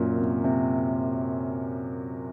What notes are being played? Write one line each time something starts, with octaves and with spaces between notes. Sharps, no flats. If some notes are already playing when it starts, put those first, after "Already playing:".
Already playing: F#2 A#2
C3
C3